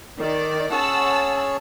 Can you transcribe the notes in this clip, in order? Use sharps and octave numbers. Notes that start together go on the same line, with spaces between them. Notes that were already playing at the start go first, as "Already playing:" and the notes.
D#3 D5
C#4 G#4 C#5 F#5 A5 E6